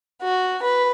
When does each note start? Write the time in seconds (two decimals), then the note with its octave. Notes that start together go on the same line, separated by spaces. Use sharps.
0.22 F#4
0.62 B4